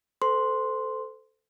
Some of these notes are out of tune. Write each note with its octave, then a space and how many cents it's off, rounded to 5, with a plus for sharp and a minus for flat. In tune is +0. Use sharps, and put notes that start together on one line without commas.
A4 +0 C5 -30 C6 +0